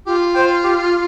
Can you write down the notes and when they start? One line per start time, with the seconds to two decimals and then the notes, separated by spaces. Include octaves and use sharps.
0.06 F4 G4
0.34 C5 G5
0.64 G4